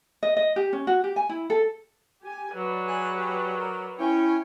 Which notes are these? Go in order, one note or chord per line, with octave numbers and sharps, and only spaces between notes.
D#5
D#5
G4
C#4
F#4
G4
G#5
E4
A4
G4 G#5
F#3 B4 D5
G#4 G#5 F#6
G4 G#4
A#4
C#4 E4 C#5 G5 G#5